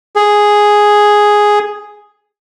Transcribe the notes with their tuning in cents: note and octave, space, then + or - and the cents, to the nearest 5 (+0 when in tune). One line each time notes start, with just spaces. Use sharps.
G#4 +0